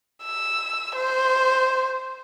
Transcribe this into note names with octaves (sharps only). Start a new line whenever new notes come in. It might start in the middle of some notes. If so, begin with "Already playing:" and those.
E6
C5